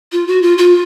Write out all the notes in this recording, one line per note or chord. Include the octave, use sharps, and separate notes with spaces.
F4
F#4
F4
F4